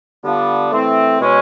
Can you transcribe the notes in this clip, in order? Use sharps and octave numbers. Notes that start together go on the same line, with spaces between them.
D3 G3 B3 D4 F4
E3 A3 C4
B2 G#3 C#4